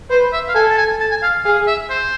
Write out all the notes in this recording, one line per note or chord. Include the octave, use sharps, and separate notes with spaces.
B4 C5
E5
F5
A4 G#5
A5
G#5
A5
G#5
F5
G#4 F5
E5
C5